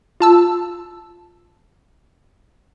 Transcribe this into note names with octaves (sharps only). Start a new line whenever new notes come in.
F4 A5 E6